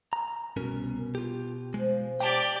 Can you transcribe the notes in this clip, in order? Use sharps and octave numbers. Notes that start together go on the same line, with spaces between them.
A#5
C2 B2 C#4 A#4
F4 G4
F3 G#3
G4 D5 G5 A5